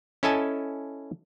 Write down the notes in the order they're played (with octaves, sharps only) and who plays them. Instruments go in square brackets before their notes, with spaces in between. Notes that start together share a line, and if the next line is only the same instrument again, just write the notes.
[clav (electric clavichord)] C#4 E4 A4 D#5 G#5 A5